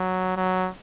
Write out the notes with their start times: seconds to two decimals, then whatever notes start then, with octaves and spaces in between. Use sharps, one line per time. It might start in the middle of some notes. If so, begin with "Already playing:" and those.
Already playing: F#3
0.37 F#3